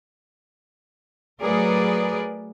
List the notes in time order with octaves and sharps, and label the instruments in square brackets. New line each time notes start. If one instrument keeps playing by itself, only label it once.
[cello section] F#3 A3 G#4 A#4 B4 D5